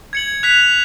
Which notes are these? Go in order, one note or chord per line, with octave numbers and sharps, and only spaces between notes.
G#6 C#7 F#7
F#6 B6 F7